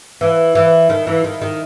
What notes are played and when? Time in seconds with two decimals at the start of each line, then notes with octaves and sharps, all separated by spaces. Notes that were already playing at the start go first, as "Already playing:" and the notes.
0.21 E3
0.55 E3
0.90 D#3
1.07 E3
1.24 D#3
1.42 D#3